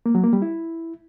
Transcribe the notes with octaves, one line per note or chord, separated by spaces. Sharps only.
A#3
F#3
A#3
G3
E4